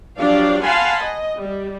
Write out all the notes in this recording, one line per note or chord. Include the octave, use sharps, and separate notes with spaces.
F3 F#3 D4 G4 D5 F5
F5 F#5 G#5 A5 B5 C6
D#5
G3